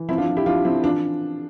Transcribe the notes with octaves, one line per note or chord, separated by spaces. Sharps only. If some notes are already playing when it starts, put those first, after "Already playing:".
Already playing: E3
F3 C4 E4
D4 F4
F3
E4 G4
F3 D4 F4
F3 C4 E4
E3 D4 F4